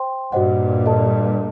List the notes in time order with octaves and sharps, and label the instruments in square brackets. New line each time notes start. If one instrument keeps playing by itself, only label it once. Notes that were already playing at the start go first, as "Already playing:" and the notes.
Already playing: [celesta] C5 G5 C6
[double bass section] G2 A#2 [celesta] F#4 C5 D#5 F#5
[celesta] A4 D#5 A5